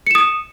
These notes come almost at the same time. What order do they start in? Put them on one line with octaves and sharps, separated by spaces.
C#7 E7 D#6